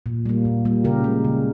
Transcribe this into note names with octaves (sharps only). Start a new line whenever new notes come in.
A#2
G3 A#3
A#2
G3 A#3
C#3 G4 A#4
G#3
C#3